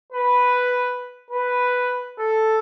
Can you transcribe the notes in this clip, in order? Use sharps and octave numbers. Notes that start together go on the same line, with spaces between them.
B4
B4
A4